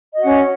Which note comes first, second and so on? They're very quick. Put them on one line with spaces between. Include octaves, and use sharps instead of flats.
D#5 F#4 F#5 C#4